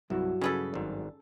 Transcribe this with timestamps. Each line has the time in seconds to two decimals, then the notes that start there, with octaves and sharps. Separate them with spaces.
0.10 C2 G2 F#3 E4 F#4
0.41 C#3 C#4 G#4 A4 B4
0.74 G#1 G#2 D5